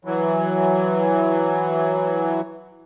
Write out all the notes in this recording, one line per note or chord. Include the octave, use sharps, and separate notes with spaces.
E3 F#3